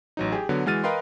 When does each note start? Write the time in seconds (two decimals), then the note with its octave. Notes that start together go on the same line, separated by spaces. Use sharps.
0.17 A1 F#3 D#4
0.32 G4 G#4
0.49 D3 F#3 B3
0.66 E3 G#3 F#4 F6 A6 D#7
0.84 A#4 B4 D#5 F5 G5 C6